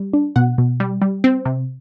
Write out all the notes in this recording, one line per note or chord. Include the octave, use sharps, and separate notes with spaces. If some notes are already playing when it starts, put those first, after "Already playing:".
Already playing: G3
D4
B2 F#5
B2
G3
G3
C4
C3